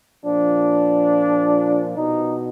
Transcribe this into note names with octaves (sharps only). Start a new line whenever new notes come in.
A#2 F3 D4
B2 D#4